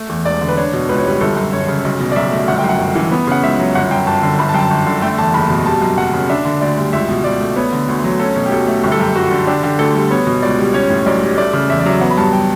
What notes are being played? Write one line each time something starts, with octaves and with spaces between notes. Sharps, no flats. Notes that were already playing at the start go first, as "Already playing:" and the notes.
Already playing: A3
E2
E1 D5
D3
B4
D4 C#5
B2
C#2 B4
C#5
G3 B4
G1 A4
F#2
G1 C#5
C#3
B1
B2
D5
B1 E5
A3
G1 F#5
G5
F#2
F#5
G1
E3
B3
C#3 F#5
C#2 E5
F#3
G1 F#5
F#2 G5
G1 A5
D3
G1 B5
A5
F#2 G5
A5
G1 G5
D3
A3 G5
E2 A5
F#1 B5
B2
G3 A5
F#2
F#1 F#5
C#3
D4 E5
D3
D2 D5
G3
C#2 E5
B2
C#2 D5
A3
B3 C#5
D3
D2
F#3
C#4 A4
B2
G4
B1 A4
A3
G1 G4
A4
F#2 G4
G1 F#4
D3
D4 G4
D3 G4
D2 A4
G3
B3 C#5
B2
C#2 D5
G3
C#4 C#5
A2
B1 D5
G3
A3 D5
C#3
E2 E5
D5
F#3 E5
B3 F#5
B5
G2 A5
G5